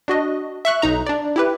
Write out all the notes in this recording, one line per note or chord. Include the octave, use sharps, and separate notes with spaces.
D4 F#4 D#5
E5 C#6 F#6
B1 D#4 A#5
D4 D5
E4 G4 B4